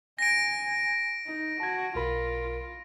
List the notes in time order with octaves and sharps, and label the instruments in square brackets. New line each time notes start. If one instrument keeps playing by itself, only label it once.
[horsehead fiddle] G#5 [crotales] A#6 D7
[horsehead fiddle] D#4
[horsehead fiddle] F#4 [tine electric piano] A5 G#6
[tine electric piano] B1 A#4 B5 [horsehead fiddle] F4